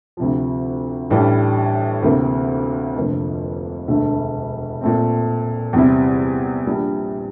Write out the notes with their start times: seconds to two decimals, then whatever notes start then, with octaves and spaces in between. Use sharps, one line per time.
0.17 D2 C3 F3
1.10 A1 A2 E3 G3 D4
2.03 D2 C3 E3 A#3
2.96 F1 F2 D3 F3 A#3
3.88 E1 D2 D3 A3
4.81 A#2 A3 C4
5.73 E2 C3 G3 C4 E4
6.66 A#1 A#2 G3 D4